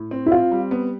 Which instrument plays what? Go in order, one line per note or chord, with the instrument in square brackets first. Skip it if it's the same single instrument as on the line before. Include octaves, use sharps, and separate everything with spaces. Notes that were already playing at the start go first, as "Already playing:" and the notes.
Already playing: [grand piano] A2
C4
[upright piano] E4
[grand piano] C4 [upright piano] F4
[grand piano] G3
B3